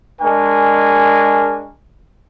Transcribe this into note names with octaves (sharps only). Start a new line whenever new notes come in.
G#3 D4 A#4 G#5 C#6